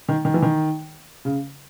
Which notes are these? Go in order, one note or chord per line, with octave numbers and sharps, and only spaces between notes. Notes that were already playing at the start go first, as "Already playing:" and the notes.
D#3
D#3
E3
D#3
C#3